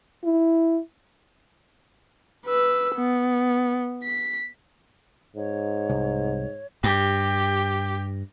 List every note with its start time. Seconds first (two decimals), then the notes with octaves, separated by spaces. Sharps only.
0.24 E4
2.47 B4 E6
2.95 B3
4.03 B6
5.37 G#2 C#5
5.90 C2
6.84 G2 G4